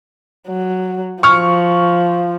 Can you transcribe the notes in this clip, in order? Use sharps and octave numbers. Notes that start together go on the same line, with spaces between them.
F#3
F3 C#6 F6